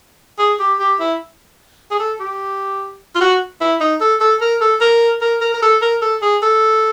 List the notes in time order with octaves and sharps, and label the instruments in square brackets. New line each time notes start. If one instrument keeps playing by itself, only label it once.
[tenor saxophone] G#4
G4
G4
E4
G#4
A4
G4
F4
F#4
E4
D#4
A4
A4
A#4
A4
A#4
A#4
A#4
A#4
A4
A#4
A4
G#4
A4